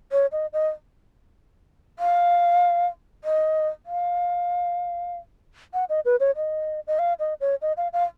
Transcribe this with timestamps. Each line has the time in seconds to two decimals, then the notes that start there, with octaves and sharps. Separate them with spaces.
0.12 C#5
0.32 D#5
0.53 D#5
1.99 F5
3.24 D#5
3.86 F5
5.74 F#5
5.89 D#5
6.05 B4
6.20 C#5
6.36 D#5
6.87 D#5
6.99 F5
7.19 D#5
7.41 C#5
7.62 D#5
7.77 F5
7.93 F5